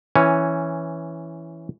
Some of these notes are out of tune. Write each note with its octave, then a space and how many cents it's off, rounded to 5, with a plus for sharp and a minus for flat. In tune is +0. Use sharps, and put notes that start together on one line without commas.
E3 +0 C#4 +0 G#5 -5